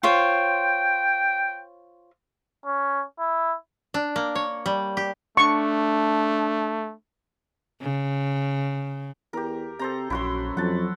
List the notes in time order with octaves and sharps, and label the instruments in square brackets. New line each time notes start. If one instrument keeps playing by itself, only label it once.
[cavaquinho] F4 C5 C#5 [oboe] G5
[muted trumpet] C#4
E4
[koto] D4
A#3
C#5
G3
G4
[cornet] A3 [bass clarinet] D4 [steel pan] C#6
[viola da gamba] C#3
[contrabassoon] E2 [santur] G4 A#4
[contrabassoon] C3 [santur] A4 C5 A#5
[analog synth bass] A#1 [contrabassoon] F#2 [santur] E4 F#4 C6
[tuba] F2 [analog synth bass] F#3 [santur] F#5 A5